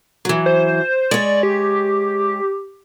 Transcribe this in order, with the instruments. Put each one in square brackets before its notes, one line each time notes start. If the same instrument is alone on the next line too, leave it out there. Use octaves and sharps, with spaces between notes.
[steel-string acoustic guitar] E3 F#3
[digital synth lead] C5
[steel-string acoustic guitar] G#3 C#5 [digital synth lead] D5
[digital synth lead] G4